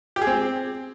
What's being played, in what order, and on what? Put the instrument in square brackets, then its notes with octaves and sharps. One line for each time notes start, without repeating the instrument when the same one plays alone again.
[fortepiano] G4
G#4
C4